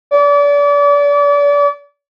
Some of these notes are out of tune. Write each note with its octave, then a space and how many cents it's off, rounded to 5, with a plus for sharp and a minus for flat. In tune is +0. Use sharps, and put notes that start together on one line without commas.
D5 -35